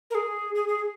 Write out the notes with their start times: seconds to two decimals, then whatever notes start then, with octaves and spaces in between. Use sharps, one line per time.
0.10 A#4
0.15 G#4
0.55 G#4
0.68 G#4